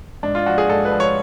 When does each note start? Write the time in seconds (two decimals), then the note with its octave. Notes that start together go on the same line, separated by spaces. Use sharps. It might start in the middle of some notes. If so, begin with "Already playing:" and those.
0.23 G#2 D4
0.35 F4
0.46 F3 F#4
0.58 G#4
0.69 G#2 A4
0.85 B4
0.92 F3
1.00 C#5